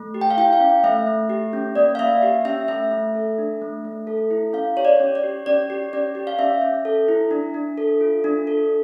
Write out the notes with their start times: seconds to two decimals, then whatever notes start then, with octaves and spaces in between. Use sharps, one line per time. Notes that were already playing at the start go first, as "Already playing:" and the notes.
Already playing: A3
0.14 G4
0.21 G5
0.30 F5
0.37 E4 G5
0.53 F5
0.60 C#4
0.84 A3 E5
1.07 A3
1.30 G4
1.53 C#4
1.75 A#3 D5
1.95 F5
1.99 A#3 E5
2.23 G4
2.45 C#4 E5
2.68 A3 E5
2.91 A3
3.15 A4
3.38 D4
3.61 A3
3.85 A3
4.07 A4
4.31 E4
4.53 C#4 F5
4.77 G4 C#5
4.85 D5
5.00 C#4
5.15 D5
5.24 G4
5.46 C#4 D5
5.70 G4
5.93 C#4 D5
6.15 G4
6.27 F5
6.39 C#4 E5
6.62 C#4
6.85 A4
7.08 E4
7.31 D4
7.54 D4
7.78 A4
8.01 F4
8.24 D4
8.47 A4